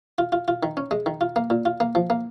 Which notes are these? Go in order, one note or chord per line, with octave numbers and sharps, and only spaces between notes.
F4
F4
F4
D#3
C#4
G#3
D#3
F4
A#3
A#2
F4
A#3
F3
A#3